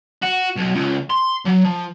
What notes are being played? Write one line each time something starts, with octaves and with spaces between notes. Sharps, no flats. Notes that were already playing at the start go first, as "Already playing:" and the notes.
F#4
B1
C#2
C6
F#3
F3